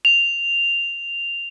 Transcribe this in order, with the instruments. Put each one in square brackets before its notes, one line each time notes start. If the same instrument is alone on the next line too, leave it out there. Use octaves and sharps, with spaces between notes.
[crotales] F7